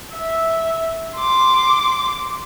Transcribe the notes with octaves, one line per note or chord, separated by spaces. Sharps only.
E5
C6 D6